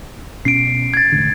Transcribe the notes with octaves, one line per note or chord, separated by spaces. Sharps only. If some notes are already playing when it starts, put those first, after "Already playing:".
B2 C#4 C7 D7
G#6 A6
E1 A2 D3